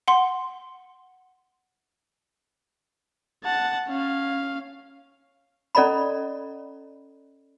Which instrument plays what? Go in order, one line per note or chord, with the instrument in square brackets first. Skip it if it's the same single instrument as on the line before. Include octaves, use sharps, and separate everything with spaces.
[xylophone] F#5 C6
[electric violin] F#5 A5
C#4 F5
[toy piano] C#4 A4 D5 D#5 A#5 B5